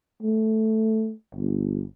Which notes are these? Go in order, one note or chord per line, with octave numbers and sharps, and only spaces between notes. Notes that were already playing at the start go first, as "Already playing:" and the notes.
A3
G1